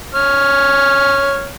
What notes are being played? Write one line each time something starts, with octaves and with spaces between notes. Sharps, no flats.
C#5 F6